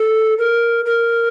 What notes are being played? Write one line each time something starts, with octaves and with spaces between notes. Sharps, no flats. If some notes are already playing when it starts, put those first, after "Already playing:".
Already playing: A4
A#4
A#4